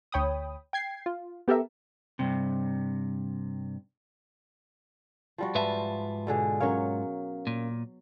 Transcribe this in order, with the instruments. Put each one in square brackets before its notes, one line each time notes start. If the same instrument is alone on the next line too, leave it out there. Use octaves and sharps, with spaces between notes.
[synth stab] D2 C#5 G5 B5 D#6
G5 G#6 C7
F4
B3 G4 A4 A#4 E5
[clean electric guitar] G2 C3
[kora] F3 G3 F#4
[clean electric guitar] G#2 F4 E5 [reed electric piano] B4 A5
[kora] B2 D3 G#4
[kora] F#3 C#5 [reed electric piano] C#4 A#4 F5
[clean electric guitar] A#2